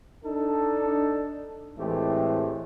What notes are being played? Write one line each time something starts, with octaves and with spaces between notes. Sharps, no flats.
D4 D#4 A4
A2 E3 G#3 A3 C4 G4